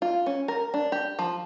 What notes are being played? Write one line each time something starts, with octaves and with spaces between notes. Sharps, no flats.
F4
C#4
A#4
D4
G4
F3